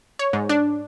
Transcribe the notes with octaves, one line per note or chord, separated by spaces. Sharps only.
C#5
G#2
D4